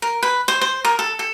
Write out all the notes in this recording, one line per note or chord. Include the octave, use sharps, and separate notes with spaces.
A#4
B4
C5
C5
A#4
A4
A4